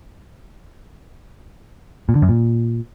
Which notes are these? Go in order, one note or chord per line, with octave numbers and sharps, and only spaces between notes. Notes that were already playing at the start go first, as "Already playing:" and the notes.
A#2
D3
F#2
A#2